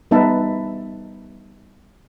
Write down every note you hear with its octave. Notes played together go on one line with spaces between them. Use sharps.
G3 B3 D#4 B4 E5 A5